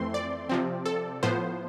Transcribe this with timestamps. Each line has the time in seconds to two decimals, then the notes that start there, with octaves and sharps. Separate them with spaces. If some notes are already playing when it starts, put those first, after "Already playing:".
Already playing: F2 E3 A3 C4 C6
0.14 D5
0.49 C3 F3 C4
0.86 A4
1.23 A2 F3 B3 C5